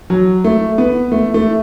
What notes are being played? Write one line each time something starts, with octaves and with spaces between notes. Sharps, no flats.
F#3
A3
B3
A3
A3